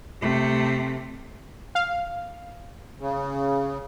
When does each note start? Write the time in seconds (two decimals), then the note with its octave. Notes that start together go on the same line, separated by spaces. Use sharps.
0.21 C3 A3
1.75 F5
3.00 C#3